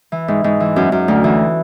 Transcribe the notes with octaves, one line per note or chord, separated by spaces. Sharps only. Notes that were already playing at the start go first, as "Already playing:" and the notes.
E3
G#2
G#2
E3
F#2
F#2
D2
E3